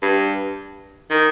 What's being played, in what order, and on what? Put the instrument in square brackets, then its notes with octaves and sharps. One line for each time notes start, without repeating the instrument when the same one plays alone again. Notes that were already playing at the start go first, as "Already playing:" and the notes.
[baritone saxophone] G2
D#3